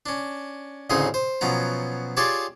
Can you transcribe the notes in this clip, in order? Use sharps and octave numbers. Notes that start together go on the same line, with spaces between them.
C#4 D4
A1 D2 C#3 C4 D#4 G#4
C5
B2 F3 F#3 C#4 A#5
F4 G4 G#4 C#5 D5 A5